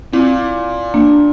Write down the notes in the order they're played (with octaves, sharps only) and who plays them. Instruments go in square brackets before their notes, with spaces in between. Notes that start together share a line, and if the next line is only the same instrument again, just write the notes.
[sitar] A#2 [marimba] C4 E4
[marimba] A#3 D4